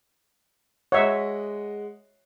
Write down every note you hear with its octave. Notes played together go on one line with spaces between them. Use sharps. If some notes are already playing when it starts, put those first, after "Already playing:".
G#3 C#5 D#5 E5 F#5